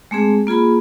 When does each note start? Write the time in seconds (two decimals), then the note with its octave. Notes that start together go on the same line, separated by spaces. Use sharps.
0.11 G#3 A3 C4 G#4
0.47 A#3 F4 G#4 B5